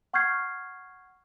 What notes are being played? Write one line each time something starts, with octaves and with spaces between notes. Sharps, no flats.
F#5 C#6 F6 G6 G#6 C7